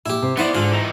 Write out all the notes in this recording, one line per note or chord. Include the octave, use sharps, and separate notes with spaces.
A#2 E4 G4
C3
B3 D#4 E4 C5 D5 F#5
G#2 D3 F4
E3 D#4